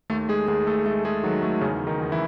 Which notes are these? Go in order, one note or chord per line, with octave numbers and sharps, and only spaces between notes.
D#2 A3 A4
G#3 G#4
D#2 G#3 G#4
A3 A4
G#3 A3 A4
G#3 G#4
D#3 F#3 F#4
A3
E2 C#3 C#4
D#3 D#4
E2
E3 E4